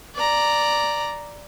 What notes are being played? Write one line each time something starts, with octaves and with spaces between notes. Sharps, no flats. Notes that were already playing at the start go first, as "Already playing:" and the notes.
D5 A#5